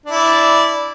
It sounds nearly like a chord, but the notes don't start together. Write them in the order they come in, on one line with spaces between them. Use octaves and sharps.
D4 E4 D5